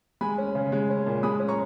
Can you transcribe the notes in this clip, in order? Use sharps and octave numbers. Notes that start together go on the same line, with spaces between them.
G#3 G#5 B5
C#4
C#3
G#3
C#4
A#2
G#3 B5 D#6
C#4
A#5 C#6